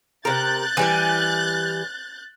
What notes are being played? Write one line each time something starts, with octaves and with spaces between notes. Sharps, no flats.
C3 A#4 F#6 G6 A6
E3 G3 G#5